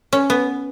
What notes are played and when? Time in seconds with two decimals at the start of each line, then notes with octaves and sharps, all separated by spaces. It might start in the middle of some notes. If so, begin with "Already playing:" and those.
0.13 C#4
0.30 B3